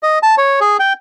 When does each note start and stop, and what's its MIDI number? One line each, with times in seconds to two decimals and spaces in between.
0.03 0.19 75
0.23 0.35 81
0.38 0.60 73
0.60 0.77 68
0.79 0.93 79